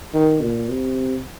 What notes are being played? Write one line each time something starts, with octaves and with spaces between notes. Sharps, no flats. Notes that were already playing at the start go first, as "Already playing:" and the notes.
D#3
A#2
C3